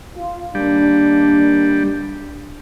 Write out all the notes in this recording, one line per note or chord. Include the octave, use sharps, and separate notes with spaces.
F4
D#3 G3 A#3 D4